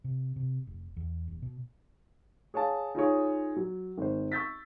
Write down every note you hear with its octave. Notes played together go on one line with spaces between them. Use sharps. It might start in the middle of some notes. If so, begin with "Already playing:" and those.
C3
C3
F1
E2
D#1
B2
G#4 C#5 F5 A5
D#4 F4 G#4 C#5
F#3
G#1 C5
C#6 E6 G6 A6 B6